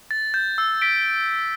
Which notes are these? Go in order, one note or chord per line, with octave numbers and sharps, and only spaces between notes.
A6
G6
E6
B6 D7